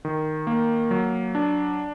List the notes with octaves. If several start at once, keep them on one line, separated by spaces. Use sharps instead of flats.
D#3
A#3
F#3
D4